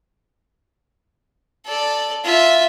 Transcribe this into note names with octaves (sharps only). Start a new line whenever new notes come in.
A4 D5
F4 E5